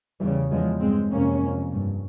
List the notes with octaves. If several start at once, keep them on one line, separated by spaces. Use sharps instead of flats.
E2 C#3 E3 G3
E2 C#3 F3 G#3
G2 G#3 C4
F2 C3 A#3 C#4
F2 C3
G2